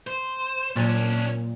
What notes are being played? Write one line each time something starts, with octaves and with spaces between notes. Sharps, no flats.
C5
A#2 F#3 C#4 D4